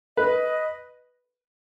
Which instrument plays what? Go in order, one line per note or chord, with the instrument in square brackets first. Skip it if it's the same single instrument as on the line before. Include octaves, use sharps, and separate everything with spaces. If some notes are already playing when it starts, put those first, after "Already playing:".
[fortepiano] B4 [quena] D#5